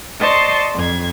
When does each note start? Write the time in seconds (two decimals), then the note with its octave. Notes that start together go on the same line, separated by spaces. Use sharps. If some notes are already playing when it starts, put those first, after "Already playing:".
0.20 C5 D5 D#5 A5 C6 C#6
0.74 F2 G#6